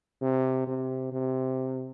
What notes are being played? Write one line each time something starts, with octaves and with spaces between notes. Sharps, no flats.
C3
C3
C3